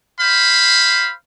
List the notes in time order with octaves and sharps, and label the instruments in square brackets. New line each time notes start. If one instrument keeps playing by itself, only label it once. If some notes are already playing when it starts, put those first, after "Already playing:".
[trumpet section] C5 F5 B5